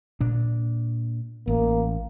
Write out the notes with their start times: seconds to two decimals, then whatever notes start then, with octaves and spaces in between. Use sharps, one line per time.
0.20 A#2 D4
1.48 A1 A#3